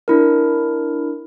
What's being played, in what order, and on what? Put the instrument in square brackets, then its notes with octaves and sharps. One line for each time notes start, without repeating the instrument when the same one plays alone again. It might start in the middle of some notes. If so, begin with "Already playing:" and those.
[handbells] D4 E4 A#4